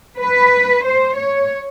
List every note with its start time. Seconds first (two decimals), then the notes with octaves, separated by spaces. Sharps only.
0.18 B4
0.85 C5
1.17 C#5